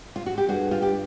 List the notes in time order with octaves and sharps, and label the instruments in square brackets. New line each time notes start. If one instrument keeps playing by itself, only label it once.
[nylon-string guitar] F4
F#4
G4
[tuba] G2 [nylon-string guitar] F#4 G#4
[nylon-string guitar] F4 G4
G4